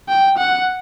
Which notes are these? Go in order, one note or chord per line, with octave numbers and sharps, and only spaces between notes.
G5
F#5